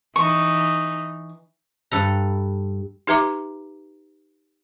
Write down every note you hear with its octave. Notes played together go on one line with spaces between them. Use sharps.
E3 D#4 C#6
G2 A4 A#5
D#4 G4 B4 E5 A#5 D6